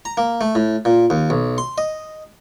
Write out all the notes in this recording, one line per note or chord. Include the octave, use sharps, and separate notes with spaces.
A#5
A#3
A3
A2
A#2
D#2
B1
C6
D#5